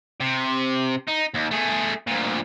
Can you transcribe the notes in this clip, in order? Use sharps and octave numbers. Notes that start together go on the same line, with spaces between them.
C3
D#4
D#2
A3 G#4
D2 A#2